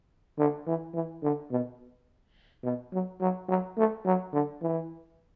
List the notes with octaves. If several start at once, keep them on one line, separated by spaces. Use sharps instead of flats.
D3
E3
E3
D3
B2
B2
F#3
F#3
F#3
A3
F#3
D3
E3